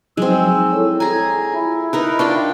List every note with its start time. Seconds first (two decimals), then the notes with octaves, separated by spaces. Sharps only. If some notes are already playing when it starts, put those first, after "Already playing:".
0.17 F3 F#3 G#3 C4 D#4 E6
0.73 E4 A4 C#5
1.00 G#4 G#5 A#5
1.54 E4 F4
1.93 D#4 A#4 B4 D#5
2.19 D4 F4 F5 G5 C#6